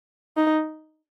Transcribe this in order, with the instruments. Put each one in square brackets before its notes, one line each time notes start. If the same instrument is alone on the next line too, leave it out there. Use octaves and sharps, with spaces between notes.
[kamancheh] D#4